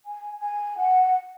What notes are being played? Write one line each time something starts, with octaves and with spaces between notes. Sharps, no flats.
G#5
G#5
F#5